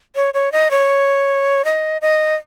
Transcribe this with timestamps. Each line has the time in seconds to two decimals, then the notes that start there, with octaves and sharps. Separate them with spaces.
0.15 C#5
0.34 C#5
0.52 D#5
0.71 C#5
1.65 D#5
2.02 D#5